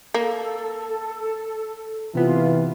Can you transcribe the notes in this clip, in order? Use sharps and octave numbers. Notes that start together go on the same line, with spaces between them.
A#3 A4
C3 E3 B3 F4